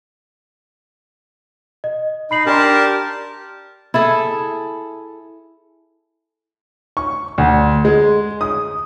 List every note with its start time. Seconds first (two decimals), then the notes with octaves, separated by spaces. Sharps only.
1.84 D#5
2.31 D#4 B5 C7 F#7
2.46 D4 G4 A#4 D5 A5 C6
3.94 E4 G#4 A4
6.97 C#6
7.38 D2
7.85 G#3
8.41 D#6